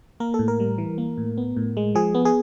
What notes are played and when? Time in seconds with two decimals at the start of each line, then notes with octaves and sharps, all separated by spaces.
0.20 A#3 A#4
0.34 A4
0.39 A2
0.48 A#4
0.60 G3
0.78 E3
0.98 A#3
1.17 A2
1.38 B3
1.56 A2
1.77 G#3
1.95 F3 G#4
2.15 B3
2.25 G#4